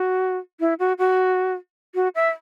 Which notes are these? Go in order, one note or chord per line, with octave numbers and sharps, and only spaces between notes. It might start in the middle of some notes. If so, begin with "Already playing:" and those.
Already playing: F#4
E4
F#4
F#4
F#4
E5